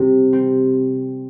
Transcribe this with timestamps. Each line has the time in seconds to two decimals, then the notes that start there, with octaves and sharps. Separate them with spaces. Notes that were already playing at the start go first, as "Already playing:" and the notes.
Already playing: C3 G3 C4
0.32 G3 C4